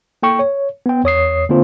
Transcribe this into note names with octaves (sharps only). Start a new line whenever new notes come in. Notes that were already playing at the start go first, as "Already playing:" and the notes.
A#3 A4 G5 C#6
C#5
B3 G5
E2 C#5 D#6 C7
D3 A#3 C4 F4 C5